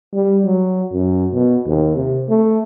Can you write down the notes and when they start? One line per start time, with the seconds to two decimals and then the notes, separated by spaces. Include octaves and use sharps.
0.14 G3
0.45 F#3
0.92 F#2
1.33 B2
1.66 D#2
1.96 C3
2.29 A3